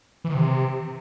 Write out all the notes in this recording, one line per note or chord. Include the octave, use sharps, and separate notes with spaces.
E3
D#3
C3